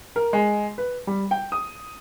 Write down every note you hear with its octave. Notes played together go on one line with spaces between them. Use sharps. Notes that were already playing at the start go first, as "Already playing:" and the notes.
A#4
G#3
B4
G3
G5
D#6